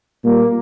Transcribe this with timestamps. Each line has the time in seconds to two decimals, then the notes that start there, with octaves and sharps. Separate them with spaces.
0.23 A#2 G3 A#3